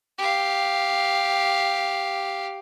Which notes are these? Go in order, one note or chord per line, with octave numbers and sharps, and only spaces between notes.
G4 F5